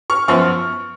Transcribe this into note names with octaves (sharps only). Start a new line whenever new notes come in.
C#6 F6
F#2 F3 B3 C#6 F6